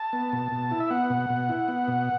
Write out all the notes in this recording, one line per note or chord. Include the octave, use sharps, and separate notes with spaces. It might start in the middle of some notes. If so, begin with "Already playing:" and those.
Already playing: A5
B3
B2
B2
E4
E5
B3 F#5
B2
B2
E4
B3
B2